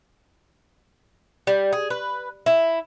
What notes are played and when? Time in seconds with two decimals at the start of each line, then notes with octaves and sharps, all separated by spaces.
1.47 G3
1.73 G#4
1.90 B4
2.46 E4